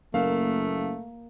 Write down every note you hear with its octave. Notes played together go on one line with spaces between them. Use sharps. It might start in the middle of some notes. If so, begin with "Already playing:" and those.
F#1 A3 A#3 F5